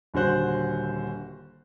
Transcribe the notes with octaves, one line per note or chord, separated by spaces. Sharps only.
D#1 D3 F#4 C5 F#6